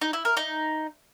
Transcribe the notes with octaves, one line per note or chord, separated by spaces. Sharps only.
D#4
E4
A#4
D#4